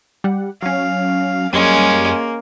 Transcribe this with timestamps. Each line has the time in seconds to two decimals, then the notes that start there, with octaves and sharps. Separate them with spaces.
0.24 G3 F#5
0.62 F#3 C#4 F5
1.53 F#2 G3 G#3 A#3 C#4 D#7